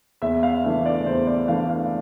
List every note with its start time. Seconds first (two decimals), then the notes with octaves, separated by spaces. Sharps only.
0.22 E2 E5
0.43 F5
0.63 E3 A3 D4 E5
0.85 D5
1.06 E2 C5
1.27 D5
1.48 E3 A3 D4 F5
1.70 F5